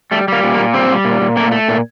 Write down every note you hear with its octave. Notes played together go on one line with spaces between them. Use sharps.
G3 A3
G3 A#3
A#2
A#3
A#2
G3 C4
G3
A#2
A#2
A3 A#3
A3
A#2